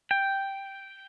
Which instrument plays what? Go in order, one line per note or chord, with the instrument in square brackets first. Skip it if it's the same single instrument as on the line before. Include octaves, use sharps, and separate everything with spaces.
[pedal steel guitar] G5